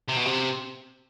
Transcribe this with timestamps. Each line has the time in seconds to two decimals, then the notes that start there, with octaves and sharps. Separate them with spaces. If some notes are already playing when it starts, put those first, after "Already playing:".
0.08 C3
0.17 B2
0.25 C3